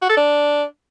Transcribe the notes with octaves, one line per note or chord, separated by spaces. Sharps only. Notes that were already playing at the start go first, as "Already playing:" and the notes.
F#4
A4
D4